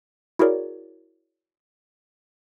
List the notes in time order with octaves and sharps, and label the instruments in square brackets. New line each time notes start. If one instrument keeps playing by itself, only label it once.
[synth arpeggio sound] E4 F#4 G#4 A#4 C#5 D5